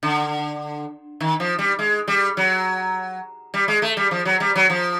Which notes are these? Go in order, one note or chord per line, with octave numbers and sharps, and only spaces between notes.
D3
D#3
F3
G3
G#3
G3
F#3
G3
G#3
A3
G3
F3
F#3
G3
F#3
F3